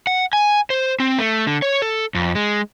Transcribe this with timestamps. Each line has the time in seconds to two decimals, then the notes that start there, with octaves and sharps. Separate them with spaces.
0.07 F#5
0.33 G#5
0.70 C5
1.00 C4
1.19 A3
1.47 D3
1.62 C#5
1.82 A4
2.15 F2
2.35 G#3